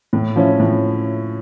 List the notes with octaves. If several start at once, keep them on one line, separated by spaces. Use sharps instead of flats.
A2
F3 C#4 E4
A2